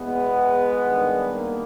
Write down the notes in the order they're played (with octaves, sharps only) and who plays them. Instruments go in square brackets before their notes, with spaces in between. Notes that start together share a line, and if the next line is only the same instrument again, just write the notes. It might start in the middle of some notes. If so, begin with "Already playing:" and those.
Already playing: [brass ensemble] E2 B2 G#3 B3
G2 D#3
A#3